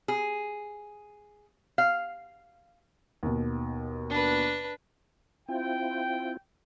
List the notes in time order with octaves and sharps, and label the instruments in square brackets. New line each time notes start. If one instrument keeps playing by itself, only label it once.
[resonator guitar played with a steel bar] G#4
F5
[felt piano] D#2 B2
[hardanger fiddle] D4 B4
[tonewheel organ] C4 E4 F4 [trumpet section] G5